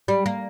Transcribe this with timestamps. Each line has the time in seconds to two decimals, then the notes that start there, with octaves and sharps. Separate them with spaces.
0.08 G3
0.26 A#3